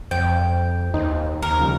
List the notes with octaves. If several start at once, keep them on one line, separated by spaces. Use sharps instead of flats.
F2 C5 G5
D#2 D#4 C5
D#2 A#4
C#3 F3 G3